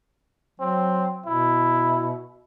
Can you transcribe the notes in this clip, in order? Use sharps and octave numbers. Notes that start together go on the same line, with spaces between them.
F#3 C4
B2 E4